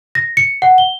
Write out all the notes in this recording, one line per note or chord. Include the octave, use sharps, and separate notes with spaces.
A#6
C#7
F#5
G7